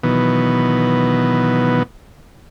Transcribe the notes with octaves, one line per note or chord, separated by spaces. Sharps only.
B2 D#3 E3 F#3 B3